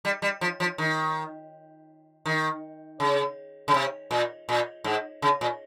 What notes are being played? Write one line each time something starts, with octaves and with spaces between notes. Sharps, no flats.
G3
G3
F3
F3
D#3
D#3
C#3
C#3
C3
A#2
A#2
G#2
C#3
A#2